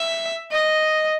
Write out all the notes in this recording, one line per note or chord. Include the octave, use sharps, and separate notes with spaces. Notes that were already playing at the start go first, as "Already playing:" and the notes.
Already playing: E5
D#5